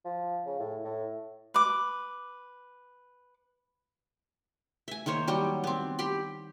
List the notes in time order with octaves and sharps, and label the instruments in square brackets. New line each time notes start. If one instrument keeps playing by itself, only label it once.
[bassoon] F3
C#3
A2
A2
[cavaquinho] B4 D6
[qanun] E5 G#5
D#3 A#3 C5 C#5
F#3 G3 G5
B3 C4
G4 B5 C6